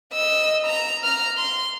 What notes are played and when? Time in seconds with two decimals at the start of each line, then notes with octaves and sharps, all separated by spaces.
0.13 D#5 E6
0.66 A#5
1.03 A#5 F6
1.37 C6